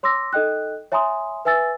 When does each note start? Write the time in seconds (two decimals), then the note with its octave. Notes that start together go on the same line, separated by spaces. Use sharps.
0.03 C#5 C6 D6 E6 A#6
0.33 D#4 A4 D#5 G5 F#6
0.92 C#5 E5 G#5 A#5 C6 D#6
1.45 B4 E5 G#5 E6 A6